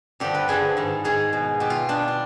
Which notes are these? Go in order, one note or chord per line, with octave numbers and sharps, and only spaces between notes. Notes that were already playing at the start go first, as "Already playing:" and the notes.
G2 D3 F3 G4
B4
G2 D3 F3 G#4
G#2 D#3
G#2 D#3 G#4
B2
B2 G4
F4
B2 D4
F4